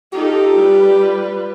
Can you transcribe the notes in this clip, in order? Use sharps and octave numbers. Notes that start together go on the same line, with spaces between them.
D#4 F4 G4 A4
G3 F4 B4